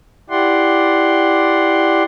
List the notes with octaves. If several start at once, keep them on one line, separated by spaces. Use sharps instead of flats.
E4 G4 D5 F#5 C6